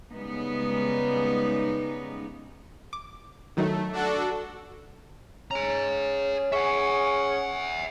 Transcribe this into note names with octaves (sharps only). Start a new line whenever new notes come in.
C#3 G3 G#3 B3 D#4
D6
D#3 F#3 A3 D#4
D4 F#4 A4
C#4 G#4 A#5
C#4 G#4 E5 F#5